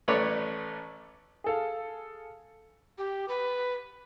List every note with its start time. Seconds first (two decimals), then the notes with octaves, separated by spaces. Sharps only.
0.08 A1 A2 A3 B4 C#5 D5
1.44 G#4 A4 F5
2.98 G4
3.28 B4